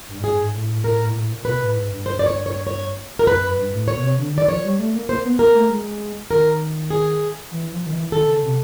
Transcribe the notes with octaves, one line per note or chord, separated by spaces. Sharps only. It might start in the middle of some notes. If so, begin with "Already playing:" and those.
G2
G#2
G2 G#4
G#2
A2
A2
A2 A#4
A2
A#2
A2
A#2
B2 B4
A2
G#2
G2
C5
D5
C#5
C#5
C#5
A#4
F#2 B4
F#2
G2
A2
C#5
B2
C3
D3
D#3 D5
F3 C#5
G3
A3
A#3
A#3 C5
B3
A#3 A#4
A3
G#3
D#3 A#4
G#4
E3
F3
D#3
E3
D#3 A4
C#3
C3